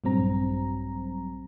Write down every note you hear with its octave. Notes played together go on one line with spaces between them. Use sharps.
A#1 G2 F#3 C4 A#5